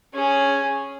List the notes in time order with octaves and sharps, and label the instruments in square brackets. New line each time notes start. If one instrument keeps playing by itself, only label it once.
[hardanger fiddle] C#4 G#4